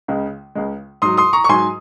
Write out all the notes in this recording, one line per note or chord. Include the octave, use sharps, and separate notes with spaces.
C#2 C#3 G#3
C#2 C#3 G#3
G#2 F#3 C6 D#6
C6 D#6
A#5 C#6
C#6
G#2 F#3 G#5 C6